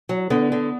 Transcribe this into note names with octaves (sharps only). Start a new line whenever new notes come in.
F#3
D3 B3
D3